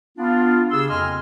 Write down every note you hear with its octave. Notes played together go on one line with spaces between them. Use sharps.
B3 D4 F4
C#3 G4 G#4 C6 E6
F2 A#3 D#5 G#5 C6 F6